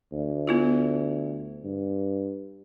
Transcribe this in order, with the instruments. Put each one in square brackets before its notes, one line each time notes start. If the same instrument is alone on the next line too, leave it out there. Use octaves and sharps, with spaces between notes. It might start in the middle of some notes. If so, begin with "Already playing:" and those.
[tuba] D2
[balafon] B3 E4 F4
[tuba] G2